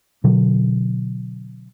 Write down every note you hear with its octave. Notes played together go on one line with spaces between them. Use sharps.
B2 D3 F#3